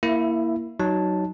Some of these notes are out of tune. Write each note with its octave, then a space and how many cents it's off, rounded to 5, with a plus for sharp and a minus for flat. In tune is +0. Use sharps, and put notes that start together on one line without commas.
A#3 +0 E4 +0 E5 +20
F#3 +15 D#4 +0 A5 +0